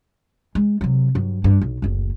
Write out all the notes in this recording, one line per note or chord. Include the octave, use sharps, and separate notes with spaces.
G#3
C3 F#3
G2 F#3
G2
B1
F#1 D2